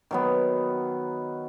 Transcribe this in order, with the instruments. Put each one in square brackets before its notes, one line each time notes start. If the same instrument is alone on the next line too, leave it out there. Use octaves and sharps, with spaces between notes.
[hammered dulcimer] D#3 F#3 B3